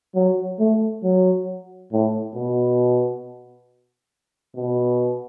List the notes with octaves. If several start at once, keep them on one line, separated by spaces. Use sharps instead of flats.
F#3
A3
F#3
A2
B2
B2